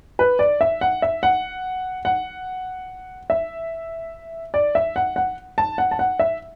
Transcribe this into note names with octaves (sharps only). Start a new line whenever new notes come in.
B4
D5
E5
F#5
E5
F#5
F#5
E5
D5
E5
F#5
F#5
A5
F#5
A5
F#5
E5